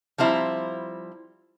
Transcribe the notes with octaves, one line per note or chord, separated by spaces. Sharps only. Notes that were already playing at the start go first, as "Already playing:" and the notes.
F3 G3 C4 E4 A#5